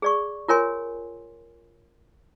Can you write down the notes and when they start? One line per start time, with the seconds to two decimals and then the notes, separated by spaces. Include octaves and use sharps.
0.02 G#4 D5 C#6
0.48 F4 A#4 C#5 G#5 C6